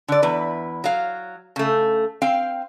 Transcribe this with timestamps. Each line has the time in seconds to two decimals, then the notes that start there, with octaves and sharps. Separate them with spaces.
0.08 D3 D5
0.22 E2 E4 B4
0.84 F#3 F5
1.56 C#3 A3
2.22 C4 F5 G5